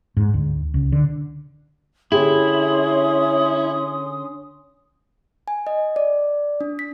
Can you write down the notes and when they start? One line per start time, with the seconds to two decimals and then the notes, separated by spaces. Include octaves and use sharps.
0.17 G#2
0.34 D2
0.74 C#2
0.92 D3
2.12 D3 C#4 E4 G4 G#4 C6 D#6
5.48 G#5
5.67 D#5
5.96 D5
6.61 D4
6.79 B6